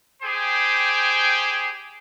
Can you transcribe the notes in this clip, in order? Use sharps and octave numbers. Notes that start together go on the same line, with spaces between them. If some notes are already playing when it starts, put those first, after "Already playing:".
G4 G#4 C5 G5 G#5